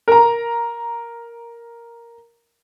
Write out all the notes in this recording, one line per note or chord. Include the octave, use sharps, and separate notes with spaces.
A#4 A#5